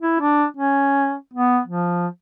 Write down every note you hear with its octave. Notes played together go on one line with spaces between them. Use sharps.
E4
D4
C#4
B3
F3